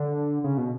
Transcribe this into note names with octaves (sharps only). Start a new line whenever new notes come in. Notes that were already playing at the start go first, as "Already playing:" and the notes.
Already playing: D3
C#3
B2